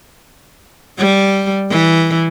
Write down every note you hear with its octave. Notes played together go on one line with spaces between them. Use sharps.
G3
E3